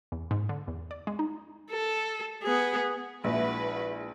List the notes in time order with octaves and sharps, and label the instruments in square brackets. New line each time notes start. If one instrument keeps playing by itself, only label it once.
[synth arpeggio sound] E2
G#2
D3
E2
D5
G#3
D#4
[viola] A4
B3 G#4
[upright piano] A#1 [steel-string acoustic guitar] G#3 E4 [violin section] F#4 B4